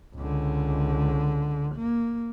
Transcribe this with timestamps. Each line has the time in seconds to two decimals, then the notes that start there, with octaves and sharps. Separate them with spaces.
0.16 C#2 D3
1.75 A#3